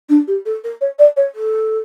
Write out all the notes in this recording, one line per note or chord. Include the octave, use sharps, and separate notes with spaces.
D4
G4
A4
A#4
C#5
D5
C#5
A4